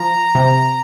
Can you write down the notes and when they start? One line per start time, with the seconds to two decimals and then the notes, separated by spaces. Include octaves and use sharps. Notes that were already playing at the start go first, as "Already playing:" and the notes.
Already playing: F3 A#5
0.35 C3